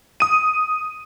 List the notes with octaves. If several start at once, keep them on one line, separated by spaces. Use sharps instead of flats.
D#6 D#7